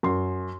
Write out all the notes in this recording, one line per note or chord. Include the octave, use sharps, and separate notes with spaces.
F#2 C6